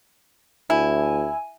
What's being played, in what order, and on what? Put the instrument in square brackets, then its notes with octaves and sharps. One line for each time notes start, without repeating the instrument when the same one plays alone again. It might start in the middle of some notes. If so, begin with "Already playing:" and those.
[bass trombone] D2 [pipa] E4 [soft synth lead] G#5